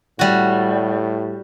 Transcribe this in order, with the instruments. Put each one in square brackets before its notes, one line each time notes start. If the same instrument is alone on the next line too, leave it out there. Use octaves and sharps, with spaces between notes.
[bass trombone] A2 [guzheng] G3 F#4